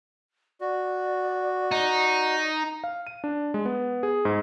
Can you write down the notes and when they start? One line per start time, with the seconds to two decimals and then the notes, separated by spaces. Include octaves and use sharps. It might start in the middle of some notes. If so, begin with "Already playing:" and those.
0.61 F#4 D5
1.72 D#4
2.84 F5
3.07 D#7
3.24 D4
3.54 G#3
3.65 B3
4.03 G#4
4.25 G#2